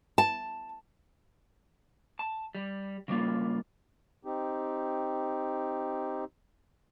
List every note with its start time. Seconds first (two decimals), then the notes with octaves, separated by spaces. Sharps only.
0.18 A5
2.19 A5
2.55 G3
3.08 C#3 G3 A#3 F4
4.25 C4 D#4 G4